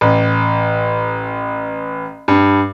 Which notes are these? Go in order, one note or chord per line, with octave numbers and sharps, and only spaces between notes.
A1
G2